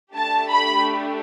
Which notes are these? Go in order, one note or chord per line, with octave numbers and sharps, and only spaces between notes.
A3 D4 G4 A5
B5